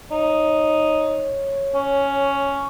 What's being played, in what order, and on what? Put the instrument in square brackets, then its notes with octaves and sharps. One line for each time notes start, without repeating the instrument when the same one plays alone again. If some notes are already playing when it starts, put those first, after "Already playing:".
[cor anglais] D#4 [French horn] C#5
[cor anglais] C#4